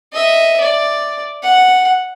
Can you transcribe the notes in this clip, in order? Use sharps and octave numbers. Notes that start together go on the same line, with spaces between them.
D#5 E5
D5
F#5